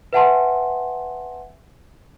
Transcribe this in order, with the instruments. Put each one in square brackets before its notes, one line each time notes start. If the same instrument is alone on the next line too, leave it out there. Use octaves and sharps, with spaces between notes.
[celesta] B4 E5 F#5 G#5 A5 C6